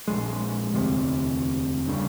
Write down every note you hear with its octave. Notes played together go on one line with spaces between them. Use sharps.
A#1 G#3
E1 D2 C3
G2 C#3